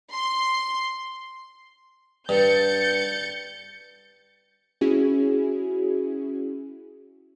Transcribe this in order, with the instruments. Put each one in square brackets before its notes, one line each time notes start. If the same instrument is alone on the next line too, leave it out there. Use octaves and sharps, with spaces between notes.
[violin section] C6
[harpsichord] G2 [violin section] G6 A6 C#7
[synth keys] C#4 E4 F#4 G#4